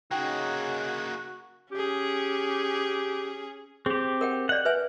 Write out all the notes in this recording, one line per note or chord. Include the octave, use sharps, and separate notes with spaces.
C#3 A#3 D#4 F#4 G#4 G5
C#4 G4 G#4
C4 G4 G#4
A#4 F#5 G5
D5 F5 F#5 G6
B4 E5 G#5